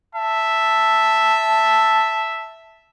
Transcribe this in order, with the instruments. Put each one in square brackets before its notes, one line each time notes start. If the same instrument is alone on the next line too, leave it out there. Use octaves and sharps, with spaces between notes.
[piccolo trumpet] E5 [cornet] A5